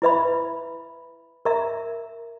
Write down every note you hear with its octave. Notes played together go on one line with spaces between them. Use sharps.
E4 B4 E5 B5
A#4 E5 A#5